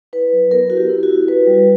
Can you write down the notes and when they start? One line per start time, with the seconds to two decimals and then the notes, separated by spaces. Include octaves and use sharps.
0.13 E4 B4
0.33 F#3
0.51 B3 A#4
0.70 E4 F#4
0.77 G4
0.89 E4
1.03 F#4
1.09 E4
1.28 F#4 B4
1.47 G3